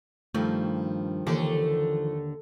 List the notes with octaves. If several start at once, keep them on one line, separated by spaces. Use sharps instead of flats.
G2 D#3 F3 A3 A4
D#2 D3 E3 A3 G4